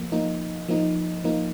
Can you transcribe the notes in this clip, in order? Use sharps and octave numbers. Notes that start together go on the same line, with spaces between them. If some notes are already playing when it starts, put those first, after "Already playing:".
Already playing: F3 A#3
F3 A#3 D#4
F3 A#3 D#4
F3 A#3 D#4